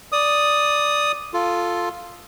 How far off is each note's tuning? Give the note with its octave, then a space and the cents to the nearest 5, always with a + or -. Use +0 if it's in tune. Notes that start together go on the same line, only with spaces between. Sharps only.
D5 +0 D#6 +0
F4 +0 A4 +0